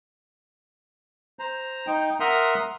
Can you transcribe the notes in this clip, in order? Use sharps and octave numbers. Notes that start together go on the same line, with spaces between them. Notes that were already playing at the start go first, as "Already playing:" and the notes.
C5 A#5
D#4 G5
A#4 E5 F#5 A#5 C6 D#6